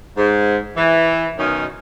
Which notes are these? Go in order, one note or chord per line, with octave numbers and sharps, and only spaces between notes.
G#2
E3
F#2 B2 D#3 C#4 D#4